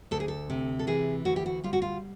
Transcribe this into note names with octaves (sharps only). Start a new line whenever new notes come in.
D2 A4
G#4
A4
C3
A4
E3 G#4
D2 F#4
G4
F#4
G3 F4
F#4
F4